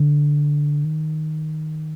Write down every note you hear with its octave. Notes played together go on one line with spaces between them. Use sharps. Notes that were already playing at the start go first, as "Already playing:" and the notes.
Already playing: D3
D#3